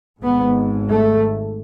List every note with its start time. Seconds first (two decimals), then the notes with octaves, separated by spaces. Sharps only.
0.23 G#1 G#2 B3
0.88 A3